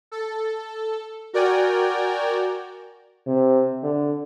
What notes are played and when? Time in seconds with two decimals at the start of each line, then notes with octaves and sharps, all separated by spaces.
0.12 A4
1.33 F#4 A#4 D5 G5 G#5
3.26 C3
3.83 D3